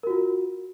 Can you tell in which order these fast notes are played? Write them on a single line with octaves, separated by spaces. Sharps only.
A#4 F#4 F4